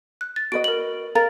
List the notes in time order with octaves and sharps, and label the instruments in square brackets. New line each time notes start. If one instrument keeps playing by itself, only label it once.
[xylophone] F#6
A6
[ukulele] F#4 B4 D#5 [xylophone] D7
[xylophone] A#4 F#7
[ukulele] A#4 [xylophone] F5 A#5 A6